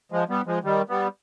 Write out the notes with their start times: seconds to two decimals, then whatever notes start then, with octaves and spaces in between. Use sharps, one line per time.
0.12 F3 G#3
0.29 G3 B3
0.47 F3 G#3
0.64 D#3 G3
0.89 G3 B3